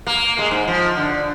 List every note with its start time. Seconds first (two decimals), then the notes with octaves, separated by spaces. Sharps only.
0.07 A#3
0.38 G#3
0.51 G#2
0.68 F3
0.97 D3